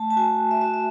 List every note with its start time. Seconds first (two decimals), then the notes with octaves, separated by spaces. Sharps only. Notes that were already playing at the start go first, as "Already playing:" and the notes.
Already playing: A3 A5
0.11 A5
0.16 F#4 G#5
0.39 F#4
0.51 E5
0.61 F#4 E5
0.74 E5